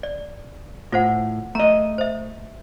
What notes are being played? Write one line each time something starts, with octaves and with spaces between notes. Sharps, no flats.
D5
A2 F4 C5 F#5
A3 D#5 A#5
C5 E5